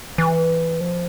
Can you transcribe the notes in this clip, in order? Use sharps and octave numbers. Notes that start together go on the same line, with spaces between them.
E3
F3